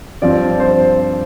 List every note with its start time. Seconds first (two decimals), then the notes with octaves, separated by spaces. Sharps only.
0.22 G2 F3 C4 D5
0.60 C5